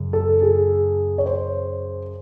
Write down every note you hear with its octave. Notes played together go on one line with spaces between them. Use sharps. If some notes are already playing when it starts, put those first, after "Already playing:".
Already playing: F#2 C#3
A4
G#4
C#5
C5